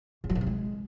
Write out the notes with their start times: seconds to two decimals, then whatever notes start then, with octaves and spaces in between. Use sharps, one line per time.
0.24 C#3
0.29 F#3
0.35 A#2
0.41 C3
0.47 G#3